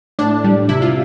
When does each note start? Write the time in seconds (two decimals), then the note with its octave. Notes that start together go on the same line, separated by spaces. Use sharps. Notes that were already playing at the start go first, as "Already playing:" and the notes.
0.19 A2 D4
0.44 G3
0.69 C3 E4
0.82 F4